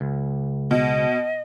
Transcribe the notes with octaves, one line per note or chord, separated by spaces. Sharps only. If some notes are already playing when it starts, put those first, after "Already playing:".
C#2
B2 D#5